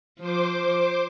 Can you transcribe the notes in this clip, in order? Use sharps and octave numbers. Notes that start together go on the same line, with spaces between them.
F3 C5 D6